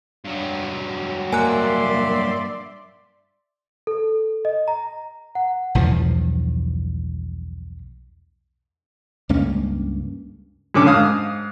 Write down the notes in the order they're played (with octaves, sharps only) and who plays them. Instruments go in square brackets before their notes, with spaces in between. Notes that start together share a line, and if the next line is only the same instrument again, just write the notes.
[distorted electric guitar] G2 F#3
[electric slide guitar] A#3 [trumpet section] D5 E5 C6 [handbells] G#5 A#5 F#6
[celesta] A4
D#5
A#5
F#5
[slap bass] B1 E2 G2 F3
C#2 G2 A#3 C#4
[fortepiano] F#2 D3 C#4 D6
G#2 F5 D#6